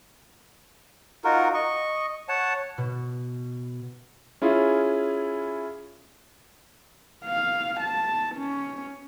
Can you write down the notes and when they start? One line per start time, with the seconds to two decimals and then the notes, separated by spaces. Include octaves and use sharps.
1.24 D#4 F4 F#4 A#4
1.54 D#5 C#6
2.29 C#5 F#5 A5
2.78 B2
4.42 C#4 E4 F4 G#4
7.24 F5
7.80 A5
8.35 C#4